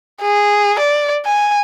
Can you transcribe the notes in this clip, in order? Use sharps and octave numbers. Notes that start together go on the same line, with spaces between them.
G#4
D5
G#5